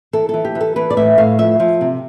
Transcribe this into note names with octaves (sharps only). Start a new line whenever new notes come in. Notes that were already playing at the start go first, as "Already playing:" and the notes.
E3 A4
E3 A4
G4
E3
A4
E3 B4
D5
A2 E5
A2 F5
F3 E5
F3
C3